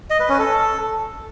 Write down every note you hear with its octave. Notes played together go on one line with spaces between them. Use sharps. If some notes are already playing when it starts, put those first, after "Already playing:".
D#5
B4
C#4
A4